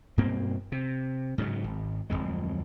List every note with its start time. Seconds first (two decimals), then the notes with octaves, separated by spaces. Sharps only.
0.17 G2 B2 A#3 C4
0.72 C3
1.38 G#2 C#3 E3 F#3
1.64 G#1
2.10 D1 G#1 F2 G#3